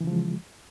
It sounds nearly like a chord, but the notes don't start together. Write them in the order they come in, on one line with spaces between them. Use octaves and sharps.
E3 C#3 F3 G#3